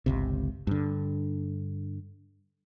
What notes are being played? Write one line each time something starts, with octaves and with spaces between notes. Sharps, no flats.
G1 C#2 C3
G2 D3